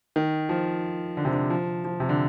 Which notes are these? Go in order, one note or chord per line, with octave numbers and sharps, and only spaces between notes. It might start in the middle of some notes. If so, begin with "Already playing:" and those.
D#3
F3
D3
C3
D3
F3
F3
C3
D3